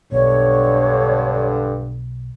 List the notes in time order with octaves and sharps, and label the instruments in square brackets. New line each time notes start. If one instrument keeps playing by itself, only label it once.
[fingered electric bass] B1 B2 [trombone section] G2 D3 [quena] C#5